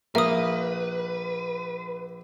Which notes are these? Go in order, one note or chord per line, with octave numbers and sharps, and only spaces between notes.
A#1 A#3 B4 E5 D#6